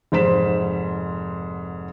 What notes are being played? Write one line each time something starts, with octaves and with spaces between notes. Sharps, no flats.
F1 G#2 C5 B6 E7